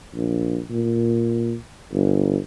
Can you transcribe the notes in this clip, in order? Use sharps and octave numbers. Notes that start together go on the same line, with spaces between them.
A#1
A#2
G1